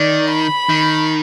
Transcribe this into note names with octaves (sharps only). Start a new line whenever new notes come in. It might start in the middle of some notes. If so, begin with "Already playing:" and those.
Already playing: D#3 D5
B5
D#3